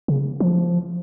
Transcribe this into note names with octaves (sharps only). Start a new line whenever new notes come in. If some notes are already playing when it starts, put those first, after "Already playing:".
C#3
F3